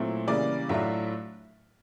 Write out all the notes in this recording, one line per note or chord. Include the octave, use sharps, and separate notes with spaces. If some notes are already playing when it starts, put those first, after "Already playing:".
Already playing: A#2 F#3 A3 C4 E4
C#3 E3 G3 A#3 D5
A2 F#3 A3 D4 F4 E5